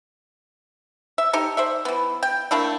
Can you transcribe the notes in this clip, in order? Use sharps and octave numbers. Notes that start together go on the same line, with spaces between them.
E5
D#4 G4 A4
C5 D5 E5
E3 B3
G5
A3 A#3 D4 E4